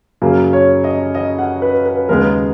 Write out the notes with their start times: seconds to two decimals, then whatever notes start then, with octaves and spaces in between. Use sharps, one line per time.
0.22 F#2 C#3 F#3 A#3
0.53 C#5
0.84 D#5
1.15 D#5
1.39 F#5
1.62 B4
1.86 B4
2.09 D#2 C#3 G#3 B3 A#4